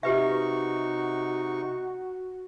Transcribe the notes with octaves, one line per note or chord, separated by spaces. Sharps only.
C3 D#4 F#4 G4 B4 E5 C#6